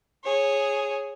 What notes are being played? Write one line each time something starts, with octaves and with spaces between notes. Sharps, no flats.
G#4 C#5